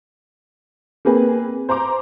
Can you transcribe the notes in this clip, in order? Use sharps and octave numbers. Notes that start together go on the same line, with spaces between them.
A#3 C4 G#4 B4
C5 A#5 C6 D6